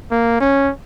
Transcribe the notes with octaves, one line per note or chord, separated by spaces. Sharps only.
A#3
C#4